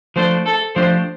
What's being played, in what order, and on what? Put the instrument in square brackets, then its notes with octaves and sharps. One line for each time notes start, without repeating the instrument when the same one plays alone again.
[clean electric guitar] F3 A3 D4 A4 D5 [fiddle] C5
[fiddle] A4
[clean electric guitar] F3 A3 D4 G4 [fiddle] C5